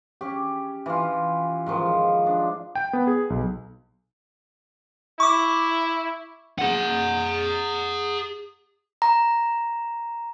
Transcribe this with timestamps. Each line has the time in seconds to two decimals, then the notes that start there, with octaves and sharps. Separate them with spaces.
0.21 C#4 G4
0.86 E3 F4
1.66 G#2 D#3 F3
2.26 D4
2.75 G5
2.93 B3
3.07 G#4
3.30 B1
5.20 E4 C#6 D6
6.58 G#4 F#5
9.02 A#5